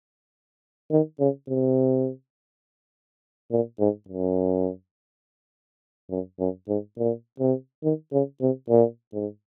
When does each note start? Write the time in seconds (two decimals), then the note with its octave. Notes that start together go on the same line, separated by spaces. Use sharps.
0.91 D#3
1.20 C#3
1.49 C3
3.51 A#2
3.80 G#2
4.09 F#2
6.10 F#2
6.40 F#2
6.68 G#2
6.97 A#2
7.40 C3
7.83 D#3
8.12 C#3
8.41 C3
8.70 A#2
9.13 G#2